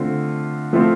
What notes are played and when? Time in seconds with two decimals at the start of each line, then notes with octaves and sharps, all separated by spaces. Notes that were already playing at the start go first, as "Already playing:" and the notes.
Already playing: D3 A3 C4 F4
0.73 F3 A3 C4 F4